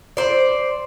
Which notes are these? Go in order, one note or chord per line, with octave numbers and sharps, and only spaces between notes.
C5 D5